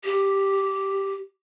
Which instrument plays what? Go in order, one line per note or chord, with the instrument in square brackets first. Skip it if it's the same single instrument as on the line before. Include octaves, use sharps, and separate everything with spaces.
[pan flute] G4